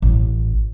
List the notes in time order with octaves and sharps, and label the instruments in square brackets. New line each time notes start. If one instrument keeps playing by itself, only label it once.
[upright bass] A1